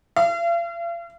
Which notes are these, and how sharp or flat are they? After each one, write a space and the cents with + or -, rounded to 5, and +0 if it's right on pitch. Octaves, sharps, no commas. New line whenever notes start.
F5 -45